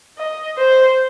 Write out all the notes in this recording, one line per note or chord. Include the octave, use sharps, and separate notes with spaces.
D#5
C5